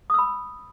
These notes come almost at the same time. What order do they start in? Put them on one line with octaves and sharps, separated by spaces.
D#6 E6 B5